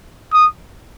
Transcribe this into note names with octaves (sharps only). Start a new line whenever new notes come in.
D#6